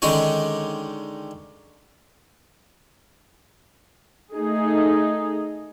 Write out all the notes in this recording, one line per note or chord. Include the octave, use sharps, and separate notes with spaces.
D3 D#3 G#3 C#4 C#5
A3 D#4 G#4